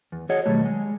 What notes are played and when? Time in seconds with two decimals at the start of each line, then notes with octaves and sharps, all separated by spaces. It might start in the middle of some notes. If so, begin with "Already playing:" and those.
0.12 E2
0.30 F#4 G#4 C#5 D#5 F#5
0.46 B2 D#3 F#3 G3 A3
0.65 G#3